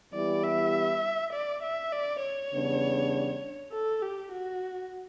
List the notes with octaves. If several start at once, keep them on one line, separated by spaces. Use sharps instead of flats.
E3 G3 B3 E4 G4 D5
E5
D5
E5
D5
C#5
E2 C#3 G3 B3 D4
A4
G4
F#4